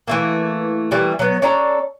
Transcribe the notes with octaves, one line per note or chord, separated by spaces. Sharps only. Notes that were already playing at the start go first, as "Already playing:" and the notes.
E3 A3 A#3
E3 G3 A3 A#3
F#3 B3
C#4 D4 A4 A#5